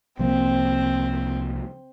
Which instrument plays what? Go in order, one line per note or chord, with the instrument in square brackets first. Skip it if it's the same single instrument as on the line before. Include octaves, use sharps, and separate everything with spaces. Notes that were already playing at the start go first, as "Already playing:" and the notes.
[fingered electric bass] C2 F3 A#3 [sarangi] C4